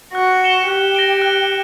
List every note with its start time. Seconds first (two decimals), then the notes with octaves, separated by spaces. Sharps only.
0.15 F#4 F#6
0.41 C#7 E7 G7
0.68 G4 F#6
0.95 A#6 D7 G7
1.22 F#6